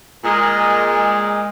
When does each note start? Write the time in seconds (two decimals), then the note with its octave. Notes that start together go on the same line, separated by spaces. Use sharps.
0.24 A#2 G#3